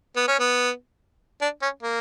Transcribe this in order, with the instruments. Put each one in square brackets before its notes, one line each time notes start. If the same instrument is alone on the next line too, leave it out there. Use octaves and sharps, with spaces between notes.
[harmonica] B3
C#4
B3
D4
C#4
A#3